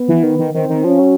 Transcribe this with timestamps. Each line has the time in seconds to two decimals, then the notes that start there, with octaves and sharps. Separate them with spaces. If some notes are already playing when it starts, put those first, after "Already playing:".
Already playing: B3
0.08 E3
0.23 D#3
0.39 D#3
0.54 D#3 C4
0.69 D#3
0.84 F3 C#4
0.99 F#3